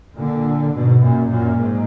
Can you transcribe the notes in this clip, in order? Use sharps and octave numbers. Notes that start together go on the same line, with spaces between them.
A#2 D3
G#2 B2
F#2 A#2
F#2 A#2
G#2